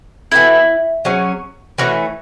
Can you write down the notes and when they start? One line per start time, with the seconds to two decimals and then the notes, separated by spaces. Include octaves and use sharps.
0.32 E3 B3 E4 F#4 A4
1.05 F#3 C#4 G#4
1.78 E3 A3 C#4 F#4